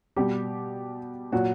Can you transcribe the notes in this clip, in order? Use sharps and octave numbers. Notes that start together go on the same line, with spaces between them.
B2 G3 G4
A#2 F#3 F#4